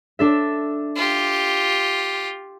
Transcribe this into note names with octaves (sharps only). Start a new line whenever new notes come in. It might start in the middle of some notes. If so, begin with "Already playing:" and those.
D4 A4 E5
F4 G4